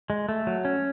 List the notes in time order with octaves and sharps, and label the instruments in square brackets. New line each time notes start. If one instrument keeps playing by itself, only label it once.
[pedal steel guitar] G#3
A3
F#3
C#4